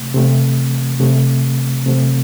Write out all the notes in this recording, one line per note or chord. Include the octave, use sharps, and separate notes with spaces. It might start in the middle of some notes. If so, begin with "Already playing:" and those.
Already playing: C3 A3 C4
C3 A3 C4
C3 A3 C4
C3 A3 C4